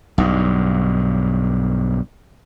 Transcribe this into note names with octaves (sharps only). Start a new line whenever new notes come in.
B1 G2